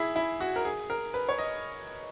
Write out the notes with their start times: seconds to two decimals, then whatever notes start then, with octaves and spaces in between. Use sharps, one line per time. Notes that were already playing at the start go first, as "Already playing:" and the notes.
Already playing: E4 G#4
0.16 E4
0.41 F#4
0.56 A#4
0.65 G#4
0.90 A#4
1.14 B4
1.29 C#5
1.39 D#5